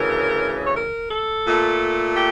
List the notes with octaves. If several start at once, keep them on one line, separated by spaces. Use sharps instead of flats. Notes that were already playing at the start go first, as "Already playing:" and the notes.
Already playing: D2 C#3 E3 A#4
C#5
A#4
A4
A#2 A3
G4